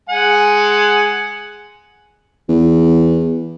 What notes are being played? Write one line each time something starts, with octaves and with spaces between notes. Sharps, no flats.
G#3 F#5 G#5
E2